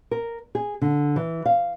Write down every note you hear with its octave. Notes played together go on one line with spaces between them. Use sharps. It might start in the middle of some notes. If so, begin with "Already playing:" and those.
A#4
G#4
D3
E3
F5